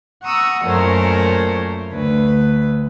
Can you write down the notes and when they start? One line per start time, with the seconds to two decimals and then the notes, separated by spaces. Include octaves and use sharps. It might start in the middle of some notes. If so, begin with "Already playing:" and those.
0.24 F#5 A#5 C#6 D#6 E6
0.64 F#2 A#2 A3 A#4 C5 C#5
1.92 D2 B4